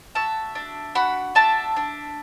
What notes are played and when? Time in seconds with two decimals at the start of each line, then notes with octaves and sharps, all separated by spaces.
0.15 F#4 E5 A5
0.55 D4
0.95 F#4 F#5 B5
1.35 D4 E5 A5
1.76 D4